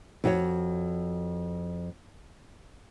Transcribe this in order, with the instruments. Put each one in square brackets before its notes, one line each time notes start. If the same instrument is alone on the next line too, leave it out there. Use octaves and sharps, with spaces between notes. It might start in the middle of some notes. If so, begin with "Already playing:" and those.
[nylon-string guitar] F2 F#4 C#5